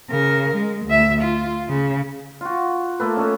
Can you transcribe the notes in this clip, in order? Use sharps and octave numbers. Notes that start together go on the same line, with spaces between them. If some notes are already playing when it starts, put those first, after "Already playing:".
C#3 A#4
G#3
D2 E5
F4
C#3
F4 F#4
A3 A#3 A4 B4
C#4 A4 D#5